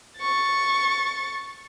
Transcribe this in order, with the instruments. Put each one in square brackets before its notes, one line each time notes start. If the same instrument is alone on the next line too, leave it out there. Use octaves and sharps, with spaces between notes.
[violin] C#6 A6